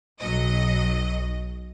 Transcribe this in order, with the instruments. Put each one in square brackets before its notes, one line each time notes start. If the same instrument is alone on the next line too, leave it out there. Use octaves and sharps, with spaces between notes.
[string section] B1 F#3 D#5